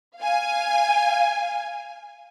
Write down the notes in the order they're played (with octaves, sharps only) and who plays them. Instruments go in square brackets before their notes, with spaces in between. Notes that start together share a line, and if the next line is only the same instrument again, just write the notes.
[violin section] F5 G#5